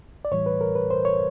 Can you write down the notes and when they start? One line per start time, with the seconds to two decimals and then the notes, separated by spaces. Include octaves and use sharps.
0.25 D5
0.31 A2 E3 G3 C#5
0.46 B4
0.61 A#4
0.75 B4
0.91 C5
1.05 C#5